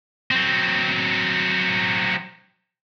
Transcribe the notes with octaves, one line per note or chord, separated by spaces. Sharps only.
F#3 C4